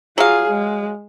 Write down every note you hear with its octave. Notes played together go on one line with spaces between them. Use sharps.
F#3 F4 G#4 F5
G#3